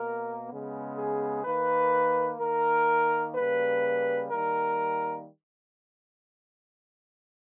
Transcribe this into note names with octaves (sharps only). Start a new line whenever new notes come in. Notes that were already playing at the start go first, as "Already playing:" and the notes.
Already playing: B2 A#3 A#4
C#3 G#3 B3
G#4
D#3 A#3 B4
D#3 A#3 A#4
C#3 G3 A#3 B4
D#3 G3 A#3 A#4